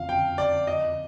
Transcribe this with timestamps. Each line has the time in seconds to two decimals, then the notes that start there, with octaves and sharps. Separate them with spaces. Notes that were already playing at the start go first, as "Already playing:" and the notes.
Already playing: F2 D3 F3 C4 F4 F5
0.09 G5
0.38 D5
0.67 D#5